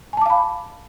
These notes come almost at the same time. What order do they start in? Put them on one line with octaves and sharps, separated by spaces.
G#5 A5 D6 F5 B5